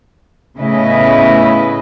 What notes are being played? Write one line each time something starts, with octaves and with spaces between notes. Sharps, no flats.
A2 C#3 B3 E4 B4 D#5